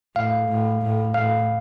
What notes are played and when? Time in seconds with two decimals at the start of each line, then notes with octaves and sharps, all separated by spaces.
0.16 A2 F5
0.49 A2
0.82 A2
1.14 A2 F5